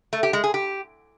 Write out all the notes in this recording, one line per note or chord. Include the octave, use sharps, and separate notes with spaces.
A3
G4
G#3
G#4
G4